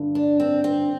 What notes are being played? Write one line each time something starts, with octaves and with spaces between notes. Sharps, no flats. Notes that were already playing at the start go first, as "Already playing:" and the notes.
Already playing: G2 D3
D4
C4
C4